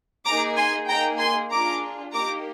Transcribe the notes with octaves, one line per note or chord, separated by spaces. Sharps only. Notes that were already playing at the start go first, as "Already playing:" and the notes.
A#3 D#4 G#4 A#5 D6
G#5 C6
A#3 D#4 G#4 G5 A#5
G#5 C6
D4 F4 G#4 A#5 D6
A#3 D#4 G4 A#5 D6